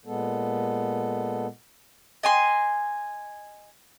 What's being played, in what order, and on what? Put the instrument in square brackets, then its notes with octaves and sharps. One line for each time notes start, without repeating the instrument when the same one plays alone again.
[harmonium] A#2 G#3 B3 A4
[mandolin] D#5 G#5 C6